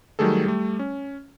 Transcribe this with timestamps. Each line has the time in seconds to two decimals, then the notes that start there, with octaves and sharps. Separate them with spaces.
0.19 D#3 F#3 G3 A3 G#4 A4
0.46 G3 A3
0.79 C#4